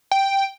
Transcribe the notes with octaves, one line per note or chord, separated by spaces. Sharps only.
G5